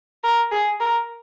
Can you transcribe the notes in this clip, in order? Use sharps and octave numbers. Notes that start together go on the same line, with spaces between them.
A#4
G#4
A#4